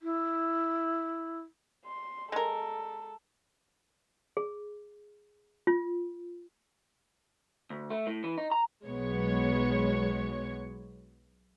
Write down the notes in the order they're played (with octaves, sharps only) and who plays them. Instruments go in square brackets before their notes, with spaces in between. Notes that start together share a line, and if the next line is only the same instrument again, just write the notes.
[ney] E4
[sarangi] C6
[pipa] G#3 A#4 [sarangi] A4
[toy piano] G#4
F4
[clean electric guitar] D2
A3
A2
E3
D#4
A#5
[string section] B1 F#3 G#3 B3 C#5 C#6